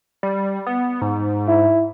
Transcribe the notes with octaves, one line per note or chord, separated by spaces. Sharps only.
G3
B3
G#2
E4